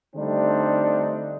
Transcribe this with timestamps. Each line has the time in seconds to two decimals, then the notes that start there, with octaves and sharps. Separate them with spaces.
0.16 D3 G3 A3 C4 D4 D#4